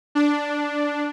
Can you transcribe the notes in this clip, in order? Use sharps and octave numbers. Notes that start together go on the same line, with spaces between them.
D4